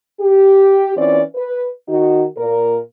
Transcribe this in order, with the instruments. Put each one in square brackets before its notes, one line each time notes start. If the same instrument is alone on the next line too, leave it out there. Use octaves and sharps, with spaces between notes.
[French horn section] G4
E3 C4 C#4 F4 D5
B4
D#3 D#4 F#4
A#2 A#4